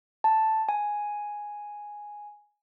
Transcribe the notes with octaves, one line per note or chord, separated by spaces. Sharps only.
A5
G#5